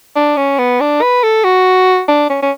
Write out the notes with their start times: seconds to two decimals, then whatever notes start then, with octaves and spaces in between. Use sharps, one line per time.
0.16 D4
0.37 C#4
0.58 B3
0.80 D4
1.02 B4
1.23 A4
1.44 F#4
2.08 D4
2.30 C#4
2.42 C#4